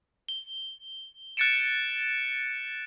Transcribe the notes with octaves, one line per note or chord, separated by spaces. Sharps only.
G7
F#6 G6 A6 C#7 D7 E7